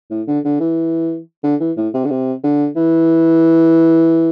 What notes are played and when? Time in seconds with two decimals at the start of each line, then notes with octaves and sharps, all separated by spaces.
0.10 A2
0.27 D3
0.45 D3
0.60 E3
1.43 D3
1.60 E3
1.77 A2
1.94 C3
2.05 D3
2.10 C3
2.44 D3
2.76 E3